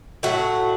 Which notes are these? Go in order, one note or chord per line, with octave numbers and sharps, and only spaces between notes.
A2 F#3 A3 F#4